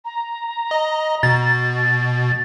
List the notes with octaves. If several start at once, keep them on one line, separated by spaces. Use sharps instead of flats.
A#5
D#5
B2 A6